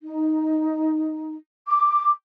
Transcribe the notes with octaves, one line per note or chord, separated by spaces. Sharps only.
D#4
D6